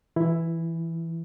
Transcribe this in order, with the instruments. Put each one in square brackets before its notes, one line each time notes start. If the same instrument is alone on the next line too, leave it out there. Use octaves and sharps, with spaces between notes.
[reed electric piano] E3 E4